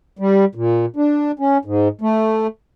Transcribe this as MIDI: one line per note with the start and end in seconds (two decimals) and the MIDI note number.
0.19 0.45 55
0.55 0.86 46
0.96 1.31 62
1.39 1.58 61
1.65 1.88 44
2.01 2.47 57